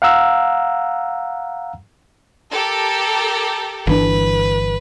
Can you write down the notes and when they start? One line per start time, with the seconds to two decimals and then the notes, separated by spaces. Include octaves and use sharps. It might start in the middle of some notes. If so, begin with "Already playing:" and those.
0.02 F5 F#5 A#5 E6
2.51 G4 A4 A#4
3.87 G1 E3 D4 B4